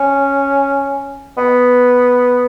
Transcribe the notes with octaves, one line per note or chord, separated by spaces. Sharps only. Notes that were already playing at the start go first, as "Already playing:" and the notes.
Already playing: C#4
B3